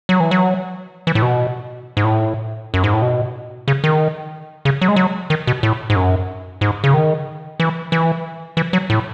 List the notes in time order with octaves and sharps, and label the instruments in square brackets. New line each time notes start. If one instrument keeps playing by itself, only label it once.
[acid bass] F#3
E3
F#3
E3
A2
B2
G#2
A2
F#2
G#2
A2
B2
C#3
D#3
C#3
F#3
G#3
F#3
D#3
B2
A2
G#2
F#2
G#2
C#3
D#3
E3
E3
E3
F#3
A2